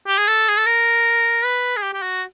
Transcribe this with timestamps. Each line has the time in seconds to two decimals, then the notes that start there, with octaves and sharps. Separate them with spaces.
0.07 G4
0.18 G#4
0.27 A4
0.48 G#4
0.57 A4
0.66 A#4
1.44 B4
1.77 G#4
1.82 G4
1.93 G4
2.02 F#4